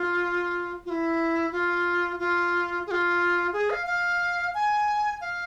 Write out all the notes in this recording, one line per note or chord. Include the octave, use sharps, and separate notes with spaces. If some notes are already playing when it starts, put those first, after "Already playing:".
Already playing: F4
F4
E4
F4
F4
G#4
F4
G#4
F5
F5
G#5
F5